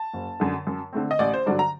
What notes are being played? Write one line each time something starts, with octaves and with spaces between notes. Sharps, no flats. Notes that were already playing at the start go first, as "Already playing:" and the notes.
Already playing: A5
F#1
F#2 D3
F#2
D3 A3 C4
D#5
A1 D5
C5
G2 D3 F#3 D5
A#5